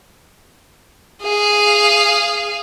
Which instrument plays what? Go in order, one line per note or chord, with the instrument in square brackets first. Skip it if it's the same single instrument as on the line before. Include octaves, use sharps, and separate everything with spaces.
[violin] G#4 F5